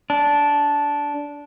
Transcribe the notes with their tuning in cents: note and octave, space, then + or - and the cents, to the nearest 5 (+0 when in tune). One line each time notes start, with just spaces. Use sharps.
D4 -10